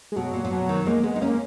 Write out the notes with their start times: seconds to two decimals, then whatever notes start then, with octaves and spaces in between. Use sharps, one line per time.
0.12 G#3
0.16 B2 F#3
0.34 A#2
0.45 A#2
0.51 B2
0.69 D#3
0.86 G#3 A#3
1.03 G#3 B3
1.16 D#4
1.21 A#3 C#4